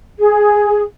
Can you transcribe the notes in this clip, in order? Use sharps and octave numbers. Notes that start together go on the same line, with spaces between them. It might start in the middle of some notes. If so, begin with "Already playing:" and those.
G#4